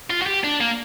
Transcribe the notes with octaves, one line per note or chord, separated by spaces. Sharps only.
F4
F#4
G4
D4
A#3